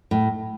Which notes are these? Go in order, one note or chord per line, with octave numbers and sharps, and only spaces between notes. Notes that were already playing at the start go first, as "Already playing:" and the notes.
A2